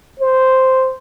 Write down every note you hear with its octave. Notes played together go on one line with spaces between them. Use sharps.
C5